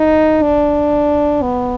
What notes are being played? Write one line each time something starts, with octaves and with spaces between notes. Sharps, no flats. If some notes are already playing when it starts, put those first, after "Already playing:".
Already playing: D#4
D4
B3